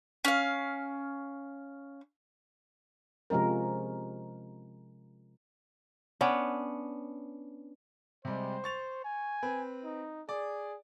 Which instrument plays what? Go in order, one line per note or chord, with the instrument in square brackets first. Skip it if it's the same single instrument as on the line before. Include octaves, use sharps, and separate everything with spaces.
[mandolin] C#4 F5
[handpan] C3 F3 G#3 C#4 A#4
[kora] B3 C#4 D4
[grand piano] C3 G3 G#3 [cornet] C5
[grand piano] C#6 A6 F7
[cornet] G#5
[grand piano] C4 B4
[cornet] D#4
[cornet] G#4 [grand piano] D5